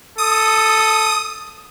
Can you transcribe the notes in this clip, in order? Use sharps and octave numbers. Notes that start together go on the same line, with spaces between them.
A4 D#6